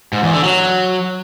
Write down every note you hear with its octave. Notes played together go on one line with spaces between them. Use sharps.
G#2
E2
D3
F#3